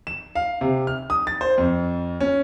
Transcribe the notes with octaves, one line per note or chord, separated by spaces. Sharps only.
E7
F5
C3
F6
D#6
A6
C5
F2
C#4